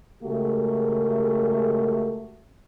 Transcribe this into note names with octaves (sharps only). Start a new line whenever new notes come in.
C#3 G#3 A3 F#4 G4 A#4